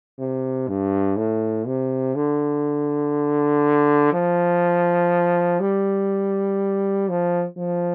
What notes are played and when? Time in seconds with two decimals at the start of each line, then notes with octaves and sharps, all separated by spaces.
0.18 C3
0.68 G2
1.17 A2
1.67 C3
2.15 D3
4.13 F3
5.60 G3
7.09 F3
7.58 F3